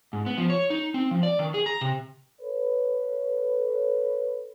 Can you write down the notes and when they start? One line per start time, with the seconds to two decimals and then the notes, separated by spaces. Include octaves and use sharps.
0.13 G#2
0.26 B3
0.38 F3
0.50 C#5
0.70 D#4
0.94 C4
1.11 F3
1.23 D5
1.39 D#3
1.54 G#4
1.66 A#5
1.81 C3
2.41 A4 B4 C#5